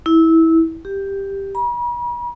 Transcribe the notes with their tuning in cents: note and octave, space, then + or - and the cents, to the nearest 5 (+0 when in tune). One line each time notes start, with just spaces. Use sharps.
E4 -20
G4 +5
B5 -45